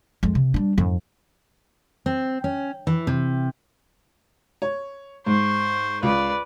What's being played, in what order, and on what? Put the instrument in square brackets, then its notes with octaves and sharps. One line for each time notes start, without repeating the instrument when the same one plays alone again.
[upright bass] F2 G#3
C3
G3 D4
F2 G#2
[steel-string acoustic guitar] C4
C#4
E3
C3
[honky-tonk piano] C#5
[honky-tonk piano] G#2 [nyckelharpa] C5 C#6
[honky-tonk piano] C#2 [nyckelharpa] B4 D5